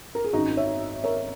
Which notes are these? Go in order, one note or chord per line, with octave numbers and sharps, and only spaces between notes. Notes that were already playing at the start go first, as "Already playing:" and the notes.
A#4
G#4
G#1 F#2 D#3 D#4 F#4
C#5 E5
A#4 C#5